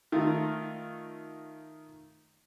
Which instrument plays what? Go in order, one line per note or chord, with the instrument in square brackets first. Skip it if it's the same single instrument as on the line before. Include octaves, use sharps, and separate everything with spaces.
[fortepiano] D#3 A3 D#4 F4